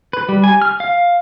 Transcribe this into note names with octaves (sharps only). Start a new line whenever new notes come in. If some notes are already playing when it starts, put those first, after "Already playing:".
B4
G3
G#5
F6
F5